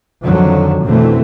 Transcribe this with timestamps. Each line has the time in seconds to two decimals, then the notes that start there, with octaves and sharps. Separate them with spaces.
0.24 F2 D3 D#3 F3 F#3
0.83 F2 B2 D3 E3 A3 C4